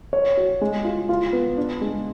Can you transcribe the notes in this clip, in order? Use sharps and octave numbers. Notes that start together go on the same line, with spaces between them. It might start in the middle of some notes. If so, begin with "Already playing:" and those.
C#5
F#4
G#3
F4
F4
B3
D4
G#3